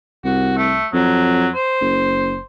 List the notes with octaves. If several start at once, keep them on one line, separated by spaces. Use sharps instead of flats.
C2 F#4
A3
F2 F#3
C5
F#1